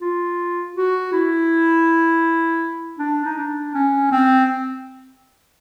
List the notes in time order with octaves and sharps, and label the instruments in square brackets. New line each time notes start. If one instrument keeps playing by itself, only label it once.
[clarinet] F4
F#4
E4
D4
D#4
D4
C#4
C4